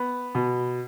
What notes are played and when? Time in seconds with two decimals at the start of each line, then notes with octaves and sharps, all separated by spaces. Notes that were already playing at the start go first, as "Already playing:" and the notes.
Already playing: B3
0.35 B2